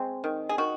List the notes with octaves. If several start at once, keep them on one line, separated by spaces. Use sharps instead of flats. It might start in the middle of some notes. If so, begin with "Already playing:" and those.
Already playing: G#3 C4
D#3
G#4
D#3 F#4